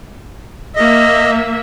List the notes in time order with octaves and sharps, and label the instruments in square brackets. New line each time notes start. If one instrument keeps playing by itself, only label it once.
[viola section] A#3 E5 [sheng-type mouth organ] D#5